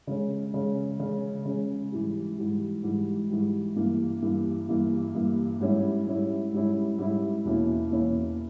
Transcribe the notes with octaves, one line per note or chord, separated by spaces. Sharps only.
C#3 G#3 C#4
C#3 G#3 C#4
C#3 G#3 C#4
C#3 G#3 C#4
G#2 E3 G3
G#2 E3 G3
G#2 E3 G3
G#2 E3 G3
G2 E3 A#3
G2 E3 A#3
G2 E3 A#3
G2 E3 A#3
G#2 G3 C#4 E4
G#2 G3 C#4 E4
G#2 G3 C#4 E4
G#2 G3 C#4 E4
E2 B2 A#3 C#4 E4
E2 B2 A#3 C#4 E4